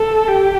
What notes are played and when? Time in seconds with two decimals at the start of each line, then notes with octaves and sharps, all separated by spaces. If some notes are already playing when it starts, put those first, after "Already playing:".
Already playing: A4
0.28 G4